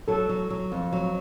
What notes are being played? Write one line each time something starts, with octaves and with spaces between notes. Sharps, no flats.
F#3 A4
F#3
F#3
F2
F#3